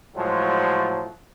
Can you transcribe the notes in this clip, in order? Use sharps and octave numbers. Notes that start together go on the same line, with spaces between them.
A2 F3 F#3 G#3